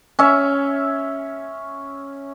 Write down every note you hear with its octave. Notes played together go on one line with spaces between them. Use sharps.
C#4 E5